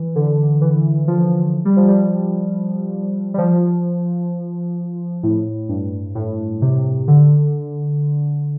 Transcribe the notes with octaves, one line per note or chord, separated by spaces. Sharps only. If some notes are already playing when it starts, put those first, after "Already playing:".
Already playing: E3
D3
E3
F3
G3
F3
G3
G3
F3
A2
G2
A2
C3
D3